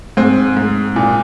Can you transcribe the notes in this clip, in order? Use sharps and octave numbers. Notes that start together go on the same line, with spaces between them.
G#2 C4
G#2
A#2